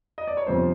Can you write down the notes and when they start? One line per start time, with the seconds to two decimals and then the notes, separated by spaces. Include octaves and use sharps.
0.18 D#5
0.27 D5
0.37 C#5
0.47 G1 F2 C3 F3 C5